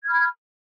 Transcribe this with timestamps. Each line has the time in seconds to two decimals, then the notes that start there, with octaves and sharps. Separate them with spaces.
0.04 G#6
0.07 F6
0.09 B5